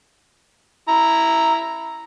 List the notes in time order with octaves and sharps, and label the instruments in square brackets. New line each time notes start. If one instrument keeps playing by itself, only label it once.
[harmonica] E4 A#5